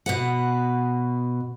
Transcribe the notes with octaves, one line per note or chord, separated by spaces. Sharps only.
B2 B4 F#5